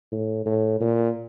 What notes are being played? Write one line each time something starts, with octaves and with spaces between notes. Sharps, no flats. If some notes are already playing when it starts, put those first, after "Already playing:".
A2
A2
A#2